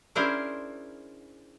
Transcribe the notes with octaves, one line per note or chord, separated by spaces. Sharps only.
C#4 D4 E4 G#4 A#4 C5